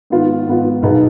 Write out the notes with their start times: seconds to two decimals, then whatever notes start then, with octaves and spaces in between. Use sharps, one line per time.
0.10 G#2 D#3 B3 F4
0.47 G#2 D#3 B3 F4
0.82 B1 B2 B3 D#4 G#4